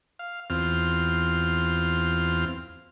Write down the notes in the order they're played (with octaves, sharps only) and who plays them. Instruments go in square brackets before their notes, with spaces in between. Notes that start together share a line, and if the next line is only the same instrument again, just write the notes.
[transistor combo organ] F5
E2 C4 F4 F6